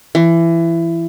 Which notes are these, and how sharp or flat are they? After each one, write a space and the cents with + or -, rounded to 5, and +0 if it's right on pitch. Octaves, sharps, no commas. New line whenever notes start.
E3 +20